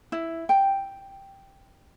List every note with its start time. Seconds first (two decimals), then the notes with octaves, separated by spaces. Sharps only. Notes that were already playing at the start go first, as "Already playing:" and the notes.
0.12 E4
0.49 G5